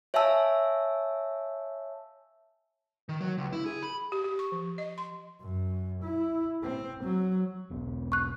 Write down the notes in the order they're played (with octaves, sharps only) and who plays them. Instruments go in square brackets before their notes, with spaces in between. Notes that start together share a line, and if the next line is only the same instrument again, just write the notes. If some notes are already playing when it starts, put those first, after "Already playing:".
[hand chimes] C#5 E5 F5 G#5 A5 E6
[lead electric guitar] D#3
F#3
C#2
E4
G#4
B5
[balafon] G4
G4
C#6
F3
D#5
C6
[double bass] F#2
E4
C4
F#3
[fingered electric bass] E1 B1 B3
[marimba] C#6 F#6